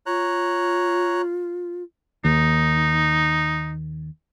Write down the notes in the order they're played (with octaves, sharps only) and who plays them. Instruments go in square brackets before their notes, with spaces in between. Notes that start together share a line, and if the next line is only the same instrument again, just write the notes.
[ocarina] F4 [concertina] C#5 A#5 F#6
[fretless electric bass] D#2 [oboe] D#4